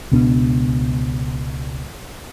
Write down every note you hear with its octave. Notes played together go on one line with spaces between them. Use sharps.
C#2 B2 B3 D4